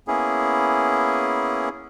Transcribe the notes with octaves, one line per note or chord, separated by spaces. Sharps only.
A#3 B3 C#4 E4 G#4